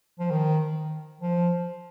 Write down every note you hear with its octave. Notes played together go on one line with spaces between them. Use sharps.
F3
D#3
F3